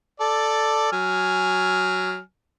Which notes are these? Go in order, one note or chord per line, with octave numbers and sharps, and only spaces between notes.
A4 D5
F#3 G#5 F6